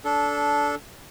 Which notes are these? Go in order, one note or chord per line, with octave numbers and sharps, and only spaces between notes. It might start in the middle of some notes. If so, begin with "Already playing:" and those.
D4 A4